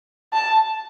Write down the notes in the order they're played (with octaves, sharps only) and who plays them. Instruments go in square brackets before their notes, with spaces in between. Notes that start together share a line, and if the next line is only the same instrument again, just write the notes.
[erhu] A5